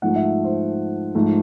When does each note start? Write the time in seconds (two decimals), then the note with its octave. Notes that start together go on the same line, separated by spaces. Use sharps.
0.02 G#2 F3 A3 F#5
0.16 E5
0.44 C5
1.15 G#2 F3 A3